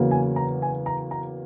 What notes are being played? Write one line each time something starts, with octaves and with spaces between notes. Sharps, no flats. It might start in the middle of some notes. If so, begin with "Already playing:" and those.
Already playing: E2 C#3 F#3 A#3
G#5
A#5
G#5
A#5
A#5